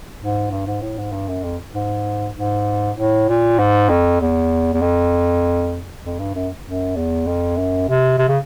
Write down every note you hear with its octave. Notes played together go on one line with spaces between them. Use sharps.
G#2
G2
G#2
A2
G#2
G2
F#2
F2
G#2
G#2
A2
A#2
G#2
F2
E2
E2
F2
F2
G2
F#2
F#2
E2
F2
F#2
C3
C3
C#3